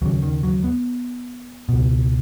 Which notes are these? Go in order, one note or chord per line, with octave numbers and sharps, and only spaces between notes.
D#2 C#3 F#3
D#3
F#3
B3
C#2 B2